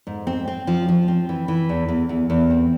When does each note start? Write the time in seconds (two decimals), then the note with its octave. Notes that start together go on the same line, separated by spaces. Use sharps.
0.07 G#2
0.27 C4
0.48 C4
0.67 F3
0.88 F3
1.08 C4
1.29 E3
1.48 E3
1.69 E2
1.88 E2
2.09 E2
2.30 E2
2.50 C4